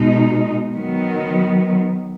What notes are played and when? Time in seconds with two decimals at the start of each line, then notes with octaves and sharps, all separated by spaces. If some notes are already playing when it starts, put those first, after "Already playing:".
Already playing: B2 G#3 D#4
0.74 D#3 F#3 B3